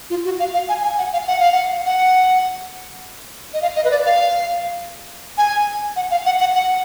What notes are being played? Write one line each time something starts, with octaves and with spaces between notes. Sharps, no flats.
F4
F#4
F5
F5
G#5
G#5
F#5
F5
F#5
F5
F#5
F#5
D#5
F5
D#5
B4
D5
F5
G#5
F#5
F5
F#5
F#5
F#5